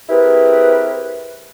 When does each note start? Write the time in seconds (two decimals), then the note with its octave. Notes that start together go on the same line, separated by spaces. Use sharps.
0.10 C4 E4 G4 G#4 A#4 B4